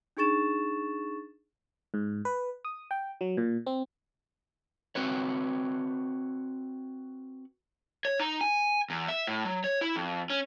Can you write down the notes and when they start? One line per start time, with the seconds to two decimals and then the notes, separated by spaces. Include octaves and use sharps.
0.17 D4 D#4 G#4 C#6 A6 E7
1.94 G#2
2.25 B4
2.65 D#6
2.91 G5
3.21 F#3
3.37 A#2
3.66 C4
4.95 C4 F#4 B4 C#5
8.05 C#5
8.20 D#4
8.41 G#5
8.90 E2
9.08 E5
9.27 A2
9.45 F#3
9.64 C#5
9.81 E4
9.96 F2
10.30 C#4